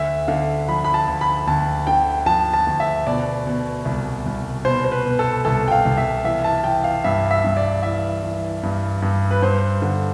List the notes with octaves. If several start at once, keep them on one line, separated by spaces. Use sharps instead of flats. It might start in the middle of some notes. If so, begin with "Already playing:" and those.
Already playing: D2 E5
D3 F5
F3 B5
B5
A5
D2
B5
D2 A5
D3 G5
F3 A5
A5
D2
E5
B2 D5
B2
C2
C2
B2 C5
C5
B4
B2
A4
C2 A4
G5
F5
C2
E5
E3 E5
A5
E3 G5
F5
G2 E5
E5
G2
D5
E3 E5
E3
G2
G2
B4
G2 C5
D3